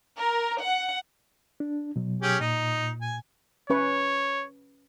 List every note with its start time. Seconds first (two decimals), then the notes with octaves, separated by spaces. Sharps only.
0.20 A#4
0.63 F#5
1.60 D4
1.96 B2 F#3
2.22 C#4 G4 G#4
2.40 A#2 D#4
3.01 G#5
3.70 C#4 B4 C#5 C#6